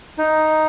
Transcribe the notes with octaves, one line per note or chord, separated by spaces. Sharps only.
D#4